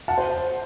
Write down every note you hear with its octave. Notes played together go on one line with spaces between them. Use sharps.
F#5 A5
C5